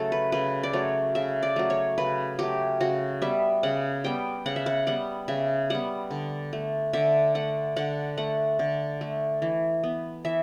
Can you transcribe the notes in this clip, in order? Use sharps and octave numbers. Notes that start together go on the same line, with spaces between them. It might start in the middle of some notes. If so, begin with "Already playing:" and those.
Already playing: C#3 F#3 A3 A4
B4
C#3 B4
D5
F#3 A3 C#5
C#3 E5
D5
F#3 A3
C#5
C#3 B4
F#3 A3 G4
C#3 F#4
G3 B3 E5
C#3 F#5
G3 B3 G5
C#3 F#5
E5
F#5
G3 B3 F#5
C#3 E5
G3 B3 F#5
D3
A3
D3 E5
A3 F#5
D3 F#5
A3 F#5
D3
A3
E3
B3
E3 E5